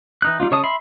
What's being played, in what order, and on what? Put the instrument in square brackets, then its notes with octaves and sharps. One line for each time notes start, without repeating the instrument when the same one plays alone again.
[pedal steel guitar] E3 D#4 F#6
G3 D4 D#4 F4
C#3 C#5 D#5 A5 D#6
E5 B5 C6